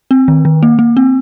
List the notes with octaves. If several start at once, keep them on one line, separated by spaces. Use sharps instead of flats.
C4
D#3
D#3
A#3
A#3
C4